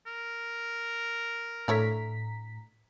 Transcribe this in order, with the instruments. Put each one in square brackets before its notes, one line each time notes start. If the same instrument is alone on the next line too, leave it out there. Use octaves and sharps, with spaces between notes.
[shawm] A#4
[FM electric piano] A2 A#5 B6 [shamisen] D3 A3 C#5